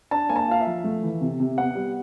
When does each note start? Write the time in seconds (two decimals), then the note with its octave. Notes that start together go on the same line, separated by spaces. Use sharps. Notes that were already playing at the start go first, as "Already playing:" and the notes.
0.11 D4 A5
0.29 A#3 G#5
0.36 A5
0.48 F4 F5
0.60 E5
0.67 F3
0.84 A3
1.03 E3
1.21 C3
1.40 C3
1.58 B3 F#5
1.75 G3